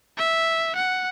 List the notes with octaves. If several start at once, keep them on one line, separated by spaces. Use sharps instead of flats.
E5
F#5